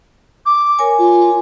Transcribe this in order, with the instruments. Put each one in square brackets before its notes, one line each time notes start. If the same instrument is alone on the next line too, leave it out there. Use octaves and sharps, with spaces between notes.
[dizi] D6
[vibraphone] A#4 C#5 G#5
[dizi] F4